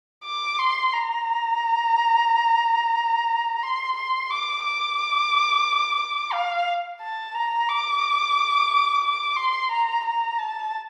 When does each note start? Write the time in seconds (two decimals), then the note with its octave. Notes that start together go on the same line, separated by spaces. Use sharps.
0.25 D6
0.59 C6
0.93 A#5
3.63 C6
3.97 C6
4.31 D6
4.64 D6
6.33 F5
7.01 A5
7.35 A#5
7.69 D6
9.04 D6
9.37 C6
9.72 A#5
10.05 A#5
10.39 A5